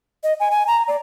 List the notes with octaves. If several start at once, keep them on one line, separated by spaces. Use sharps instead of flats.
D#5
G#5
G#5
A#5
D5